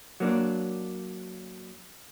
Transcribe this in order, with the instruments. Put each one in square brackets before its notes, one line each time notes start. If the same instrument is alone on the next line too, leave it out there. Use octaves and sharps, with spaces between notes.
[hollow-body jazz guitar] F#3 A#3 D4